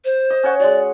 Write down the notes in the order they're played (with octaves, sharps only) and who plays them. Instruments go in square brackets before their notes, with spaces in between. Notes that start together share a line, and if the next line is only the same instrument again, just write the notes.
[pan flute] C5
[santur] D#5
C#4 C#5 F#5
[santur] G#3 F#4 [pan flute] D5